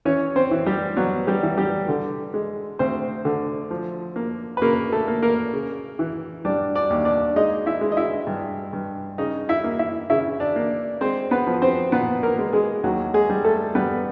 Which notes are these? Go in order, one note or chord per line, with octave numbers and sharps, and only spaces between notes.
E3 C#4 C#5
C4 C5
E3
G3 G4
F#3 B3 F#4
G3 G4
E3
G3 G4
D3
G#3
D2 C4 C5
D3
F3
A#3
B4
C#3 A#3 A#4
A3 A4
A#3
A#3 A#4
C#3
E3
G3 D4 D5
D4 D5
D#2
D4 D5
G#3 D#4 D#5
E4 E5
G#3
D#5
E4 E5
G2
G2
C#3 D#4 D#5
E4 E5
A#3
E4 E5
C#3 E4 E5
D4 D5
A#3
G#3 C4 C5
B3 B4
F3
C4 C5
A#2 B3 B4
A#3 A#4
G#3
G#3 G#4
D#2 F#3 F#4
G#3 G#4
G3
A3 A4
G3 B3 B4